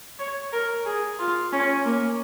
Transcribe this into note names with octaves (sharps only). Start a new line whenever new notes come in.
C#5
A#4
G#4
F4
C#4
A#3